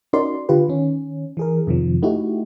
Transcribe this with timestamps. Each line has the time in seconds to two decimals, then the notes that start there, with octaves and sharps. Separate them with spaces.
0.13 C#4 D#4 F#4 A#4 D5 C6
0.49 D3 F4 G4 B4
0.68 D#3 C#4
1.37 E3 G#4 A#4
1.67 F2 C3 D#3 F3
2.03 A3 D#4 E4 F#4 G4